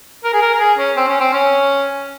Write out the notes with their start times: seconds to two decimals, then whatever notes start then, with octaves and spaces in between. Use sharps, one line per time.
0.24 A#4
0.33 G#4
0.42 A#4
0.54 A#4
0.60 G#4
0.78 C#4
0.96 C4
1.08 C#4
1.20 C4
1.33 C#4